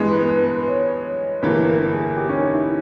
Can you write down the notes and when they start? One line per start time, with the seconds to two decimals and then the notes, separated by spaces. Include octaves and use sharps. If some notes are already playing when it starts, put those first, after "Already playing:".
Already playing: G2 E3 G#3 B3
0.11 B4
0.29 B4
0.48 B4
0.68 C#5
1.42 G1 G2 E3 A#3 B4
1.67 A#4
1.92 G#4
2.17 G4
2.29 C#4
2.36 D#4
2.54 E4